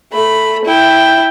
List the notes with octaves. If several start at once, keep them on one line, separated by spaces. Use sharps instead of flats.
A3 B5
E4 G5